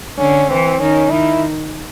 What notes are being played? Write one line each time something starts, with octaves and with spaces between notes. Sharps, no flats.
D3 C#4
E3 C4
D#3 C#4
D#3 E4